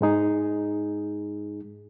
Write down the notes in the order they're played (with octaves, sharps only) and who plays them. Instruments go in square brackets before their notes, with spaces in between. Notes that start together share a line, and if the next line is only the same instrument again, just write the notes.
[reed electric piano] G#2 G#3 D#4 G#4